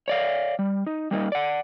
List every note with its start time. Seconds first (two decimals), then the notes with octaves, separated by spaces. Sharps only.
0.08 C#5 D5 F5
0.59 G3
0.87 D#4
1.11 G3 A#3 C4 D#4
1.32 D5 F#5